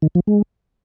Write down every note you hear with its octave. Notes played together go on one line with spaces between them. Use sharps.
D#3
F3
G#3